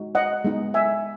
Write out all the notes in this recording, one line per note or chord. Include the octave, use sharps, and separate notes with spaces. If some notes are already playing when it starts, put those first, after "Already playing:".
Already playing: G#3 D#4 F#4
D#5 F#5
G#3 B3 D#4
E5 G#5